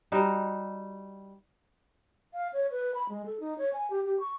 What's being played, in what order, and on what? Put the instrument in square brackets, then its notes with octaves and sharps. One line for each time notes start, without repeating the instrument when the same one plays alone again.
[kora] G3 D#4 F#4
[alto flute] F5
C#5
B4
B5
G#3
A4
D#4
C#5
G#5
G4
G4
C#6